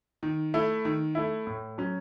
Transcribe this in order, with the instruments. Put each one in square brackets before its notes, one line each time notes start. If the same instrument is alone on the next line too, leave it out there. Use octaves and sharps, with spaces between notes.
[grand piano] D#3
A3 E4
D#3
A3 E4
A2
F#3 C#4